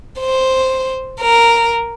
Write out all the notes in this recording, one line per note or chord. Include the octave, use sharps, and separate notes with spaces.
C5
A#4